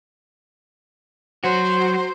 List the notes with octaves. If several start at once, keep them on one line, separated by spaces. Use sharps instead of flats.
F#3 F#4 C5